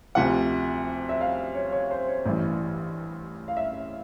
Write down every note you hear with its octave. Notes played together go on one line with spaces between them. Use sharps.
D2 C3 F3 F#5
E5
F5
C#5
C#5
C5
C#5
A1 G2 E3
F5
E5